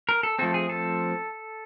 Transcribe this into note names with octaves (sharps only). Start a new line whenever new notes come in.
A#4
A4
F3 A3 C4 A4
G#4
A4